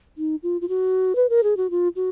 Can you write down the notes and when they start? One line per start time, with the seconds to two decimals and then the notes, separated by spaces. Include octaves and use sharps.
0.18 D#4
0.43 F4
0.61 F4
0.69 F#4
1.16 B4
1.30 A#4
1.43 G#4
1.57 F#4
1.71 F4
1.96 F#4